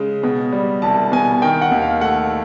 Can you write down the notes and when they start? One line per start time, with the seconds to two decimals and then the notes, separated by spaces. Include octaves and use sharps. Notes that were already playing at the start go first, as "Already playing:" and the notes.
Already playing: C#3 G#3
0.24 B2
0.53 G3
0.82 C2 A5
1.12 B2 G#5
1.42 D#3 G5
1.62 F#5
1.71 D#2
1.82 F5
2.01 A3 F#5